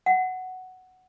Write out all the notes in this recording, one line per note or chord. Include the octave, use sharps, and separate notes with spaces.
F#5